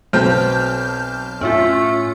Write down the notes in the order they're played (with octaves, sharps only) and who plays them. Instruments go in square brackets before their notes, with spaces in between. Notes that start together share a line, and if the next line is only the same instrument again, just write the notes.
[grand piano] B1 C4 [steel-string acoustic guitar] F#4 B4 [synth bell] A5 F6 G6
[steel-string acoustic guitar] A2 E5 [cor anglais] A3 [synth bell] C#4 F4